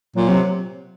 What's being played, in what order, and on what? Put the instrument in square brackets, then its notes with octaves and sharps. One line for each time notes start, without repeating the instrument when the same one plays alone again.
[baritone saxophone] A#2 [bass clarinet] F#3
[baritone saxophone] C3 [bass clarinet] F#3